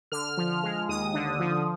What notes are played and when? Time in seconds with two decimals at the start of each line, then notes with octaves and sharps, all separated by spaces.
0.12 D3 F6
0.37 F3
0.63 G#3
0.89 D#2 D#6
1.14 D3
1.39 F3